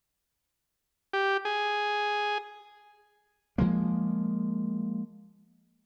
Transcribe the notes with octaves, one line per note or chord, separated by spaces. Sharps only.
G4
G#4
F3 F#3 G#3 A#3